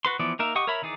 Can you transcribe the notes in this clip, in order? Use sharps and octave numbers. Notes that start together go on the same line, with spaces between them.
F#4 B4 C6
E3 F3 B3 D5
A#3 D#4 A#4 E5
G4 D#5 F#5 C#6 D#6
A#4 C#5 E5 B5
D#3 E3 D#4 G#4 D5